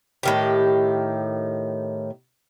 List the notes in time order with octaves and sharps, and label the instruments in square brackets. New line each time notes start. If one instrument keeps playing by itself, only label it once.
[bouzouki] A2 D#3 G4